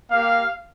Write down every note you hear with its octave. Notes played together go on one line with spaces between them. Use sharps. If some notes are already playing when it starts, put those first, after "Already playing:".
A#3 G4 F5